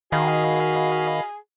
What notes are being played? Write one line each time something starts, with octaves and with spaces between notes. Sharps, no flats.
D#3 F#4 G#4 D#5 F5 B5